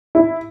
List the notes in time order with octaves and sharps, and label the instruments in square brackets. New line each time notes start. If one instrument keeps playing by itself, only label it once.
[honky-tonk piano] E4